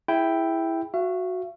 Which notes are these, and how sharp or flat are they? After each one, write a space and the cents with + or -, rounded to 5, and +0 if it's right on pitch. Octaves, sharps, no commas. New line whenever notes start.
E4 +0 G#4 +0 G5 +0
F#4 -10 E5 +45